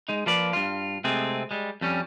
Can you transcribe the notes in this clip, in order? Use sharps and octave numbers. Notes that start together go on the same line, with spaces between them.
G#3 D#4
F3 A#3 F4 B4 D5
G2 F4
C3 G#3 A3 C4 G#4
G3 G#3
F2 G3 C#4